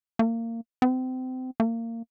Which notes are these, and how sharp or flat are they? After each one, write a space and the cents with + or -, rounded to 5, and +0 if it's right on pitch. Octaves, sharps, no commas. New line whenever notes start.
A#3 -25
C4 -30
A#3 -25